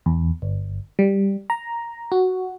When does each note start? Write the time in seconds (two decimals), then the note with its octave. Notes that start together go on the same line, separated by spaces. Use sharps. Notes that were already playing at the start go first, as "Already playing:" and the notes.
0.06 E2
0.42 G1
0.99 G3
1.50 A#5
2.12 F#4